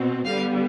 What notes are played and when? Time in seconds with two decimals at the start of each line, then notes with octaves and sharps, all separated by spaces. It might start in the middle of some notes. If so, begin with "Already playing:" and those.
Already playing: B2 C4
0.26 D3 G3 B3 F5